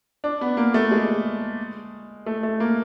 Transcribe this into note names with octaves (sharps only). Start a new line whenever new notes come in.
D4
B3
A#3
A3
G#3
A3
A3
A#3